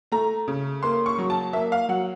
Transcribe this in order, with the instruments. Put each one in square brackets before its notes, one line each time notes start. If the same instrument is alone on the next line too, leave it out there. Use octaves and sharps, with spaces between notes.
[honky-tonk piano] A3 A#5
C#3
A#3 C6
C#6
F#3
A5
A#3 E5
F5
F#3 F#5